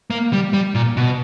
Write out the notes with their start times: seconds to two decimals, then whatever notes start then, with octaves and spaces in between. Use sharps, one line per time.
0.10 A#3
0.33 G3
0.53 G3
0.75 A#2
0.97 B2